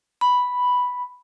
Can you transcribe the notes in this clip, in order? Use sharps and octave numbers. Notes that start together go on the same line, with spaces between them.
B5